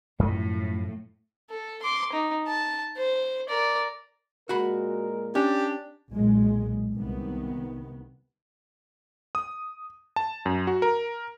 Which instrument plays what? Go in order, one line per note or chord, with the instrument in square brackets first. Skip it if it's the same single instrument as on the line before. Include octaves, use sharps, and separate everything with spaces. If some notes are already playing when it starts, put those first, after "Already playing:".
[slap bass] F#2 F3 A3 [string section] A2
[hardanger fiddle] A4
C6 D6
D#4
A5
C5
A#4 D5
[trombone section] A#2 G#3 A#4 [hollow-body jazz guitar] F#4 F#5 B5
[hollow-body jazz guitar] C#4 [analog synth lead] D4 [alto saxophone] G4
[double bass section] B1 A#2 G#3
C2 D#3 B3
[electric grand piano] D#6
A5
F#2
F#4
A#4